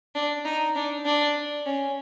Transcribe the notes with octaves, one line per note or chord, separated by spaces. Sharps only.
D4
D#4
D4
D4
C#4